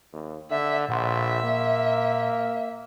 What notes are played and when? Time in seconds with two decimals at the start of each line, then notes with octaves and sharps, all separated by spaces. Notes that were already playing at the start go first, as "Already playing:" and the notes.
0.13 D#2
0.50 D3 E5
0.89 A#1 A#2 E5 F#5 C6
1.43 A#3